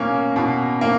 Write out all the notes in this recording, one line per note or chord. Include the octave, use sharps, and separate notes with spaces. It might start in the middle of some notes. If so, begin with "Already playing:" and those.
Already playing: B2 A#3 C#4
B2
A#3